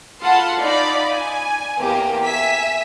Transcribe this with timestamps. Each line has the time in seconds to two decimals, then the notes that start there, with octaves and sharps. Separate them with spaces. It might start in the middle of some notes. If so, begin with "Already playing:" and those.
0.22 F4 A4 F#5 A5 B5 C6
0.60 D#4 D5 F5 B5
1.12 G#5
1.79 E2 A#3 G4
2.25 E5 G#5 B6